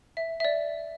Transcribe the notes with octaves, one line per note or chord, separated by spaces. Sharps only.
E5
E5
D5